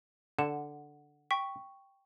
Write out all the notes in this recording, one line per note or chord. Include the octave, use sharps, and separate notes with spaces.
D3 F#5 E7
G5 C#6 B6